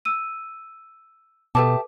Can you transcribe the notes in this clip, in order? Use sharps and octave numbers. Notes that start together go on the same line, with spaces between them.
E6 D#7
B2 G4 A4 B4 E5 A5 D6